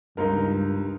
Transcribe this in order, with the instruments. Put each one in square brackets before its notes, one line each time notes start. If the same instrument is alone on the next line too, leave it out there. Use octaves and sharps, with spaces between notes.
[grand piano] C#2 D#4 A#4 [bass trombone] G2